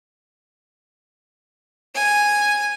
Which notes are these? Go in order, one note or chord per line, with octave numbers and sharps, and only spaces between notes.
G#5